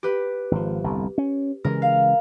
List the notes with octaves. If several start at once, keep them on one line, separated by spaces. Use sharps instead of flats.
G4 B4
G#1 F3
G1 C2 F2
C#4
C#3 E3 G#3 A#4
F5